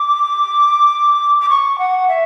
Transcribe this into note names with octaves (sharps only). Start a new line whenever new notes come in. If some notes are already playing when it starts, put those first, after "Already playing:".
Already playing: D6
D6
C#6
F#5
E5